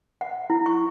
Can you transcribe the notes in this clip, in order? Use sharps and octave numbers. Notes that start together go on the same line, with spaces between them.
F#5
E4
C#6